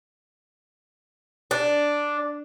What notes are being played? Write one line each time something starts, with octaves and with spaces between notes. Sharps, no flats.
D4